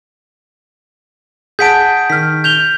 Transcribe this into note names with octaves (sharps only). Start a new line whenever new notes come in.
G#4 F#5 A5 G6 B6 D7
D#3 F6 B6
G6 F7 G7